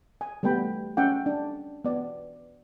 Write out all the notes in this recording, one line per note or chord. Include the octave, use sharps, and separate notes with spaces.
G#5
G3 A3 B3 G5 B5
C#4 E5 F#5 G5
D4
B3 D5